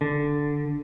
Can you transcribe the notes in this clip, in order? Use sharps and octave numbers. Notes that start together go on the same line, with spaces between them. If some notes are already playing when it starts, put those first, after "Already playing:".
D3